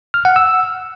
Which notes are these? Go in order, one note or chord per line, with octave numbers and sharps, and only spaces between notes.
F6
F#5
E6